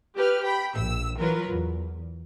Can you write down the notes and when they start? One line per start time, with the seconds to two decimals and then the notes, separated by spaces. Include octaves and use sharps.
0.16 G4 B4 F6
0.45 G5 B5
0.75 A#1 E6
1.19 E3 F#3 F4 A#4 B4
1.48 E2